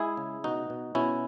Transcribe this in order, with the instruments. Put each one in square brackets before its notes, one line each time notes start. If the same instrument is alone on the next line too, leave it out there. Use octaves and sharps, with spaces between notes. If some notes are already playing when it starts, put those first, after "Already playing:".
Already playing: [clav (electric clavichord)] G#3 E4 G#4
C#3
B2 D#4 F#4
B2
B2 C#4 E4